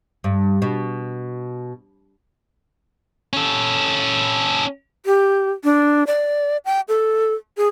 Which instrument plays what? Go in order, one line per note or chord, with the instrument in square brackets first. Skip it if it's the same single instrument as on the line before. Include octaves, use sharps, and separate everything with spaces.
[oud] G2
B2
[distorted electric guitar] C#4 A4
[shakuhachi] G4
D4
D5
G5
A4
G#4